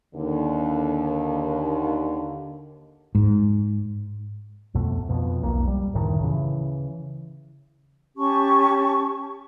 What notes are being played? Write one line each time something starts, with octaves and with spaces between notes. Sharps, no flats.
D#2 D3
G#2
C2 F2 B2 A3
F2 B2
E1 B1 A#3
G3
F#1 D2 A2 D#3
C#3 E3
C#4 G4 A5 C#6